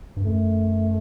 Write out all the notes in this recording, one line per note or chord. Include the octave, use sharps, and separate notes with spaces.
G2
F#2 A3